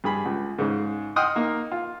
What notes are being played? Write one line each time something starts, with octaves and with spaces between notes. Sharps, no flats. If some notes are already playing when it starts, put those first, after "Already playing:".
G2 G#4 B5
C#2
G#2 C#3
D#5 F#5 G5 C6 D#6 F6
A#3 D#4
F4